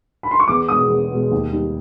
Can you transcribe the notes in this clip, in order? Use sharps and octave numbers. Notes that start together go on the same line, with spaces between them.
B5
C6
C#6
E2 D6
B2 G#3 D#6
E2
B2 G#3
D#2
D#3 G3